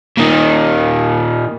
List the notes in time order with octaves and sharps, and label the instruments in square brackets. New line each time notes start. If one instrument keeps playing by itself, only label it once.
[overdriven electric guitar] A#2 D#3